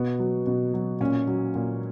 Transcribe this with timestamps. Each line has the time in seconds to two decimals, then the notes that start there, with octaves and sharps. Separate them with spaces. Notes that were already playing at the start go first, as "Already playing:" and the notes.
Already playing: B2 B3
0.19 F#3
0.47 B2
0.74 F#3
1.01 A#2 C#4
1.27 F#3
1.55 A#2